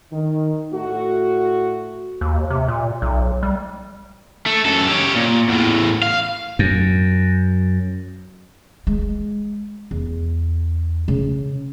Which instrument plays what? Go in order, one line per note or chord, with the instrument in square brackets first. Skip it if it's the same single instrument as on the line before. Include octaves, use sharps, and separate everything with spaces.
[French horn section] D#3
A2 A3 F#4
[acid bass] D#2
C3
A#2
B1
G3
[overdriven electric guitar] A3
F#2 A4
G4 C#5
A#2
E2 A2
F5
[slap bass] F#2
[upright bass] G#3
E2
C#3